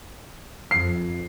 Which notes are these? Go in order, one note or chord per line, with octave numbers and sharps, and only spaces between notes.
F2 C7